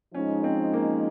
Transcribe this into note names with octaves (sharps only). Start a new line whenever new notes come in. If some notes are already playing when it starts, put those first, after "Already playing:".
F3 G#3 C#4 D#4
C4
A#3